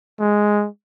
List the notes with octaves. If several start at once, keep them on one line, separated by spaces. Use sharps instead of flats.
G#3